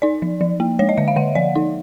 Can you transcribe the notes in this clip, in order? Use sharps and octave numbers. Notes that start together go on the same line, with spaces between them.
D#4 D5
F3
F3
A#3
G#3 C#5
D#5
D3 E5
F5
D3 F#5
F3 D5
D#4